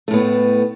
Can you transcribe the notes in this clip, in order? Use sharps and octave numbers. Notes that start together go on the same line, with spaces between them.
A2 A3 B3